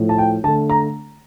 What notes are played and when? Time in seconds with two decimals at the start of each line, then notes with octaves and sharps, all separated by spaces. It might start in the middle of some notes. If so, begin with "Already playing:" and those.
Already playing: A2 F3 A3
0.09 A5
0.18 G5
0.44 D3 A5
0.48 A3
0.70 A#5